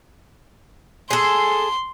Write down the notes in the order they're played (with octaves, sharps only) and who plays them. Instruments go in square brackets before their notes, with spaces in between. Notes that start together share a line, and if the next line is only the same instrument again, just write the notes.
[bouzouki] G#4 A4 [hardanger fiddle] C6